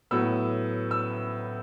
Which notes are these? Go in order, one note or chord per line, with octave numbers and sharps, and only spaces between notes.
A2 F#3 B3 E6
E6